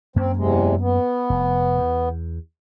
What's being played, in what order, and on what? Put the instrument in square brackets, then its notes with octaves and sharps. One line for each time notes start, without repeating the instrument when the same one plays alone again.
[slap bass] F#2 A#3 C#4 [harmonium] C4
[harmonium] E2 C3 G#3
B3
[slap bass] F1
E2